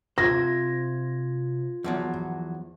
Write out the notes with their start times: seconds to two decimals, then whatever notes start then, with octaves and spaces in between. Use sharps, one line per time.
0.18 C3 F4 C5 G#6 A#6
1.84 E2 F3 F#3